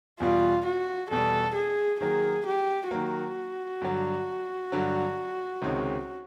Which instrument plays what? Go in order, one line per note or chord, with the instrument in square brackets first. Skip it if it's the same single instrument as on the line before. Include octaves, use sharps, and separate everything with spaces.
[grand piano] E2 B2 G3 [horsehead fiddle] F4
[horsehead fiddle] F#4
[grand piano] E2 B2 G3 [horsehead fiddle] A4
[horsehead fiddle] G#4
[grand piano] D#3 F#3 A#3 [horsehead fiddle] G#4
[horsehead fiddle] G4
[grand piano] D#3 F#3 A#3 [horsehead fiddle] F#4
[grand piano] G2 D3 F#3
G2 D3 F#3
C#2 C3 D#3 G#3 C#4